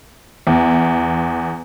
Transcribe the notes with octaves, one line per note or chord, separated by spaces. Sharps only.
E2